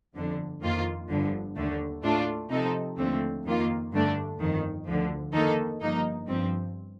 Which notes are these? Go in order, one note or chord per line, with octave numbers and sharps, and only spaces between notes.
G1 F2 D3
F2 D#3 A#3 F4
G1 G2 D3 F3
D#2 D3 A3
A2 A3 D4 F4
C3 F3 C4 D#4 A4
D#2 D3 F3 A3 C4
F2 D#3 A#3 F4
G2 D3 A3 D4
G1 F2 D#3
D2 D3 F3
F2 D#3 A#3 D#4 A4
G1 G2 F3 A#3 D#4
G1 G2 F3 C4